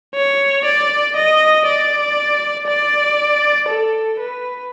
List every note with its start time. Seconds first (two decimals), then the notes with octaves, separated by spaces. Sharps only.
0.15 C#5
0.65 D5
1.16 D#5
1.66 D5
2.68 D5
3.68 A4
4.20 B4